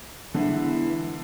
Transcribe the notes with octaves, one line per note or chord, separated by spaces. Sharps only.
D3 E3 G#3 B3 E4